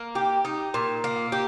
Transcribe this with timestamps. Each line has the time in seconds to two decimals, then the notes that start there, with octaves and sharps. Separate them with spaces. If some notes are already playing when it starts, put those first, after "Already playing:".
Already playing: A#3
0.15 G4
0.45 D#4
0.74 A#2
1.04 A#3
1.32 G4